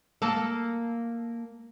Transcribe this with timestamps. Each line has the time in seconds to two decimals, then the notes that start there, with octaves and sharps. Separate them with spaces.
0.22 A#3 A4